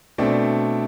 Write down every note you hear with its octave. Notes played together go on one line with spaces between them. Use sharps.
B2 A3 C4 D4